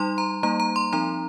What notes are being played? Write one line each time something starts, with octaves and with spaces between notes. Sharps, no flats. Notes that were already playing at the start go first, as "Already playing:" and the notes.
Already playing: G3 D#4 C6
A#5
G3 A#3 D#4 A#5
A#5
C6
F3 C4 D#4 A#5